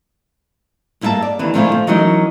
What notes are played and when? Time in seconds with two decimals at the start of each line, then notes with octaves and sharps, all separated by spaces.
1.01 G2 A#3 E4 G4 E5 A5
1.22 D5
1.39 D#2 D3 E3 B4
1.54 A#2 D3 F3 A3 E4 G#5
1.72 F4
1.87 E3 F#3 C#4 D#4 F#4 A#4